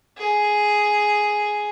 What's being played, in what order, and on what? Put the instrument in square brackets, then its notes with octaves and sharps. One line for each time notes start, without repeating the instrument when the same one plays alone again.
[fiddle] G#4